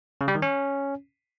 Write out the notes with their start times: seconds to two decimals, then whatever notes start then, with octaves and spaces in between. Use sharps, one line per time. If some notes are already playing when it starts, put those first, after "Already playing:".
0.21 C#3
0.28 G3
0.35 D#3
0.42 C#4